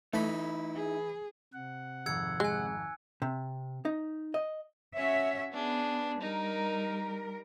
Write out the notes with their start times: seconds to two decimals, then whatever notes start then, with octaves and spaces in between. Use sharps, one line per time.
0.13 E3 A3 D#4 E4 B5
0.75 G#4
1.53 C3 F#5
2.06 G#1 F2 E6 G#6 C#7
2.40 G#3 G#5 F#6
3.22 C3
3.85 D#4
4.34 D#5
4.96 C#4 F#4 C#5 E5
5.52 B3 D4 G#4
6.21 G3 D#4 A#4